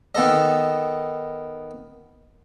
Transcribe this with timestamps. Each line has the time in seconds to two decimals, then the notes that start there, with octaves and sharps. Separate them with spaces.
0.15 D#3 B3 A4 D#5